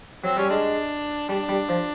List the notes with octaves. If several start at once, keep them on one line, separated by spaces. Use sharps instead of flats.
F#3 C4
G3 C#4
G#3 D4
G3 D4
G3
F3